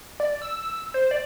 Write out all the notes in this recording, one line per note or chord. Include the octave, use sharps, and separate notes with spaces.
D5
E6
C5
D5